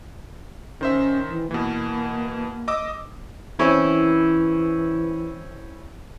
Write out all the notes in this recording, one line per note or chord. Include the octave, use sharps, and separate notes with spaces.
D#3 C#4 C5 E5
E3
B2 E3 A#3
D#5 D6 E6
E3 C4 C#4 E4